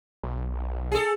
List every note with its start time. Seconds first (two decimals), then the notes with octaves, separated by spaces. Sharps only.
0.23 B1
0.92 G#4 A4